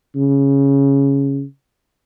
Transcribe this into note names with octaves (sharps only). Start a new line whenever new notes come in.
C#3